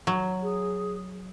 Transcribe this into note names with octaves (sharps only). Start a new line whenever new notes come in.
F#3
G#4